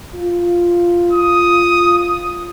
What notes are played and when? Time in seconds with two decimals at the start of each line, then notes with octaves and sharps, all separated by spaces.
0.14 F4
1.13 D#6